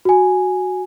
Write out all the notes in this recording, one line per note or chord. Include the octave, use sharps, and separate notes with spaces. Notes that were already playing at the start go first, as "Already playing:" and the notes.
F#4 G#5